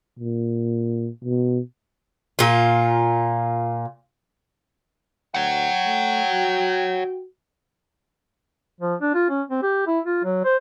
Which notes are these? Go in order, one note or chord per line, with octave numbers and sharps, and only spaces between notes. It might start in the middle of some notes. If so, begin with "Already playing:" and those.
A#2
B2
A#2 F4
D2 C#5 F#5 G5
A3
F#4
F3
D4
F4
C#4
C4
G4
E4
F4
F#3
C5